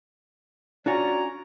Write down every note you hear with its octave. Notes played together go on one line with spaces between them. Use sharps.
C#4 D4 F4 F#4 D5 A#5